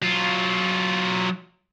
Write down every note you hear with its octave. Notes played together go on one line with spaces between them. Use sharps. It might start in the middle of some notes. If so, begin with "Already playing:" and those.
F#3 F4